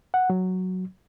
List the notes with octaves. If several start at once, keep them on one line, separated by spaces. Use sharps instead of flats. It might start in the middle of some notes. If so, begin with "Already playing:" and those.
F#5
F#3